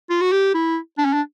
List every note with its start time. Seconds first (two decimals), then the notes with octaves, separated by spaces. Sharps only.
0.10 F4
0.21 F#4
0.32 G4
0.54 E4
0.98 D4
1.05 C#4
1.13 D4